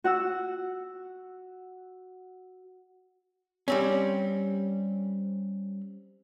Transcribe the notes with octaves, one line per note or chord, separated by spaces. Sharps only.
F#4 F#5 E6
G3 C4 C#4